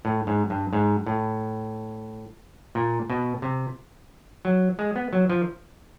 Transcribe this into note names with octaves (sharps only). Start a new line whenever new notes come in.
A2
G#2
G2
G#2
A2
A#2
B2
C3
F#3
G#3
B3
F#3
F3